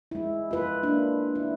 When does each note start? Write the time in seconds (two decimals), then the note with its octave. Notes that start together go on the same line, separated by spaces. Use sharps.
0.11 G#3 E4
0.51 F4 B4
0.83 A#3 D4 F4
1.35 E4